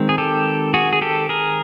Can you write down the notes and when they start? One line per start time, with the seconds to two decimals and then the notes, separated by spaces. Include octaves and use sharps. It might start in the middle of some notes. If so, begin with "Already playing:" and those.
Already playing: D#3 G#3 C4
0.09 G#4
0.18 G4 A4
0.74 F#4 G#4
0.93 G#4
1.02 G4 A4
1.29 G#4 A#4